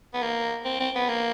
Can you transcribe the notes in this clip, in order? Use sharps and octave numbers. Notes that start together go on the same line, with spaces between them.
B3
A#3
C4
C4
B3
A#3